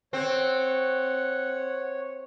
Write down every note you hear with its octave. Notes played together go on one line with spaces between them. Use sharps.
C4 C#5 F#5